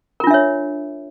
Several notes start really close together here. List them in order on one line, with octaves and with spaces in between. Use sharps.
A#4 F4 D4 E5 C#5